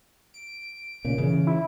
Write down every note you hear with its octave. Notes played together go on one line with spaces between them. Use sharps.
D7
A#2 C#3
C#3 E3
E4